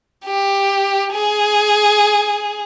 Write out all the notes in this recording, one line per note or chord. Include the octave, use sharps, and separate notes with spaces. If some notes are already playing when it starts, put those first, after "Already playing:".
G4
G#4